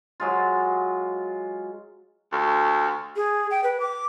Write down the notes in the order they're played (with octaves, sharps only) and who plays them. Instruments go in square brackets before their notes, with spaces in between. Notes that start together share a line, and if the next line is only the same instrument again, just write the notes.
[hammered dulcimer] F#3 G#3 F4
[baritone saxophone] D2
[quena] G#4
G5
B4
D6